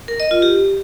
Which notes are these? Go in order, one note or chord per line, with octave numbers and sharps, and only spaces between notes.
A#4
D#5
F4
G4